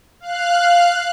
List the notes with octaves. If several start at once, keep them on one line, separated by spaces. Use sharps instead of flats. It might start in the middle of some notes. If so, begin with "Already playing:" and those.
F5 F#6